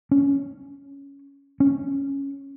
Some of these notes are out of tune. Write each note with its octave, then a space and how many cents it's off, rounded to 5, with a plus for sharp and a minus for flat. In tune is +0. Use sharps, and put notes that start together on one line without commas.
C#4 +10
C#4 +0